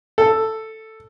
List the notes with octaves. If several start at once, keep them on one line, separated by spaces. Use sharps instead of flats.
A4